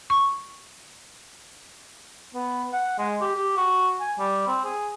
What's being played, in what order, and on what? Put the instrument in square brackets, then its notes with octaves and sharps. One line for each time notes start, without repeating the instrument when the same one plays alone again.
[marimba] C#6
[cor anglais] B3
F#5
G#3
G4
G4
F#4
G#5
G3
C4
G#4